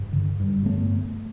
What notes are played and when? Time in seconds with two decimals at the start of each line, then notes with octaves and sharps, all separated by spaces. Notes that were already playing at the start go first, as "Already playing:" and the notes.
Already playing: G2
0.13 D3
0.40 G2
0.66 G2 A3 B3